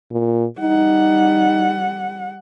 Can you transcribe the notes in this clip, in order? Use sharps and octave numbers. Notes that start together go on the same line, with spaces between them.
A#2
G3 D#4 F#5